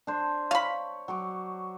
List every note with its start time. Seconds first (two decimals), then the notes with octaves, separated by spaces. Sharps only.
0.07 D4 C5
0.51 C#5 F5 B5
1.08 F#3 C#6 D6